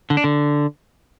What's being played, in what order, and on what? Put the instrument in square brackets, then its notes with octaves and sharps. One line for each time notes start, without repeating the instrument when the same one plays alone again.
[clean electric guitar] D3
D4
D3